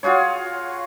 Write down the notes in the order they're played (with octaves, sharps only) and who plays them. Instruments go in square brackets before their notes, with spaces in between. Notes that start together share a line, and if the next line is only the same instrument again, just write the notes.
[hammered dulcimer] F4 F#4 G#4 C#5